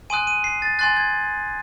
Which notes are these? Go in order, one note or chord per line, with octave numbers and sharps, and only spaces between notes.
G#5 C6 D#6 F#6 D#7
D#7
C7
A6
G#5 C6 F#6 A6
G#6